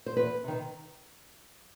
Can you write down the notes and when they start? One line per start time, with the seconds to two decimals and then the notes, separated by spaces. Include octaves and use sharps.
0.06 C5
0.17 E2 B4
0.44 C3 D#3